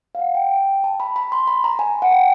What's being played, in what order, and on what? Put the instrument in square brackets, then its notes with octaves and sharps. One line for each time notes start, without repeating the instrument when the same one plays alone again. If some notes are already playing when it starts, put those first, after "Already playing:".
[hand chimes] F5
F#5
G5
A5
B5
B5
C6
B5
A#5
G#5
F#5
G5